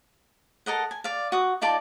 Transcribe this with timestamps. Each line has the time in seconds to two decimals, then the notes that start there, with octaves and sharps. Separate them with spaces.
0.66 A4 A#4 D#5 F#5
0.91 G#5
1.04 D5 F5
1.32 F#4 D#6
1.62 D#4 F4 D5 A5